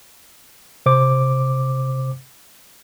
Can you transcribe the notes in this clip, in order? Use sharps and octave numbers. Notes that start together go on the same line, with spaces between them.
C3 C5 D6